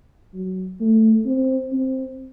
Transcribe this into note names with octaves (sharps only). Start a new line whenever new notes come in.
F#3
A3
C4
C4